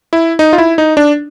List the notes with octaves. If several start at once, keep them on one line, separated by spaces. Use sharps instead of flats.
E4
D#4
F4
E4
D#4
D4